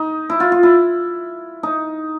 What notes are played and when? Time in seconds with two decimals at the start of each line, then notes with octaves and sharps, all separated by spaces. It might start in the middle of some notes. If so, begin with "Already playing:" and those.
Already playing: D#4
0.30 E4
0.40 F4
0.52 F4
0.63 E4
1.63 D#4